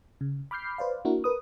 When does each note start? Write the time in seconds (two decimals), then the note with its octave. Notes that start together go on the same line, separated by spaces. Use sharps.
0.21 C#3
0.51 B5 D6 F6 G6 C7
0.78 B4 C5 D5 F5
1.05 A#3 D4 E4 F#4 A#4
1.24 A#4 B4 D#6